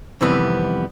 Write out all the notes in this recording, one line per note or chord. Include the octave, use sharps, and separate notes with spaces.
F2 C3 D#3 E3 G3 B3